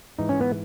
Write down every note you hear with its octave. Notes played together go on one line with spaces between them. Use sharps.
G#2 E3 D#4
C#4
B3